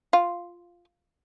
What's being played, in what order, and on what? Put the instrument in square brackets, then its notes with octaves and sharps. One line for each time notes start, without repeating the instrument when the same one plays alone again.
[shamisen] F4